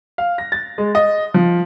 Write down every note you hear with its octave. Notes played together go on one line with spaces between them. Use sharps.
F5
A#6
A6
G#3
D#5
F3